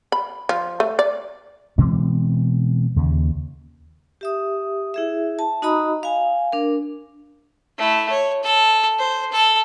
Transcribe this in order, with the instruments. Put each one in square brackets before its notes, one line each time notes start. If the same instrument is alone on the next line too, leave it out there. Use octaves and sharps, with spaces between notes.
[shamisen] B5
F3
A3
D5
[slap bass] B2 E3 G#3 C4
D#2 C#3
[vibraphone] G4 E5 D#6
E4 G#4 E5
A5
D#4 F#4 D#5 A#5 B5 D#6
F5 G#5
D4 A#4
[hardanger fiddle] A3 E4
C#5
A4
C5
A4